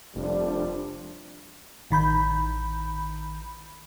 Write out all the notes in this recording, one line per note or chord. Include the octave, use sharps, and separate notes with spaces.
F1 F3 G3 D4
A1 D#3 B5 G6